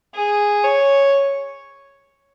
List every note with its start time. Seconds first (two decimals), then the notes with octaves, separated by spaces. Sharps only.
0.15 G#4
0.63 C#5